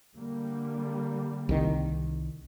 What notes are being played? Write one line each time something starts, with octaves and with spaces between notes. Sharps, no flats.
D3 G3 A#3
C2 D#3